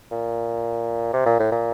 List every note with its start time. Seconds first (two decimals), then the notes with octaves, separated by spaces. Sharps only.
0.12 A#2
1.13 C3
1.26 A#2
1.39 A2
1.52 A#2